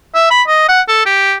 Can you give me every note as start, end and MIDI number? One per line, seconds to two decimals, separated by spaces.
0.15 0.28 76
0.31 0.42 83
0.48 0.68 75
0.69 0.81 78
0.88 1.03 69
1.06 1.35 67